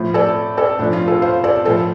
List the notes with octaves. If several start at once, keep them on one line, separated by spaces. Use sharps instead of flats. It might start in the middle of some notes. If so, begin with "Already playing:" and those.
Already playing: A2 F3
A4 D5
A4 D5
A2 F3 D4
F4
F4 A4
C5 F5
A4 D5
A2 F3 F4 A4